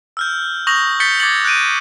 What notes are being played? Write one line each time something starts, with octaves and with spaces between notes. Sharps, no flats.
E6 F6 G6
C#6 D#6 G6 A#6 F7 F#7
G6 A6 B6 C#7 G7
D6 G#6 A6 C#7 F#7
F#6 G6 D7 D#7